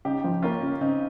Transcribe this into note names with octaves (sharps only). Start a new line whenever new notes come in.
C#3 D#4 G4
F3
A#3 C#4 F4
C#3
C#3 C4 D#4